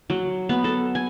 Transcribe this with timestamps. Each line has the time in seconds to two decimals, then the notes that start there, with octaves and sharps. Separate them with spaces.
0.10 F#3
0.49 B3
0.64 A4
0.95 G#5